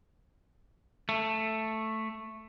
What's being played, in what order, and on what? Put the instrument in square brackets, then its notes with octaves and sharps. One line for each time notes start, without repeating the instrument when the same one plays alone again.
[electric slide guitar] A3